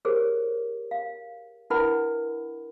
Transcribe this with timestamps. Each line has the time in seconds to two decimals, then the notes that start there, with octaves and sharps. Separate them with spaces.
0.05 G4 G#4 A#4 C5 C#5
0.91 F5
1.70 D4 E4 A#4 B4 F#5 B5